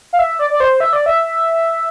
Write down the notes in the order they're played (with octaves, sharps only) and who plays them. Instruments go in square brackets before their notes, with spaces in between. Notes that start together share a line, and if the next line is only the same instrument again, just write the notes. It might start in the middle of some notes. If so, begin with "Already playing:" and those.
[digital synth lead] F5
E5
D5
D5
C5
E5
D5
E5